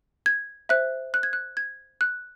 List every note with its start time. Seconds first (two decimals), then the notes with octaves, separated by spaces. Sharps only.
0.26 G#6
0.69 C5 E5 F#6
1.14 F#6
1.23 G#6
1.33 F#6
1.57 G#6
2.01 F#6